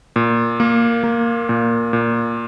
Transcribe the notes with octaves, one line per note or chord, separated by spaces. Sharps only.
A#2
A#3
A#3
A#2
A#2